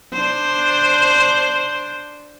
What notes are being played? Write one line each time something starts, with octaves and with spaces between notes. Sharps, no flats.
D4 C5